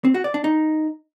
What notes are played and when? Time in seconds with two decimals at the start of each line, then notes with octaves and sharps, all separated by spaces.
0.05 C4
0.14 F#4
0.24 D5
0.34 D4
0.44 D#4